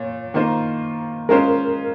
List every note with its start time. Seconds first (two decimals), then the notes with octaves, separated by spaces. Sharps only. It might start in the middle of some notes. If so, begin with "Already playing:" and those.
Already playing: A#2 C#5
0.34 D#3 A#3 F4 C5
1.29 G#3 C#4 F4 A#4 C5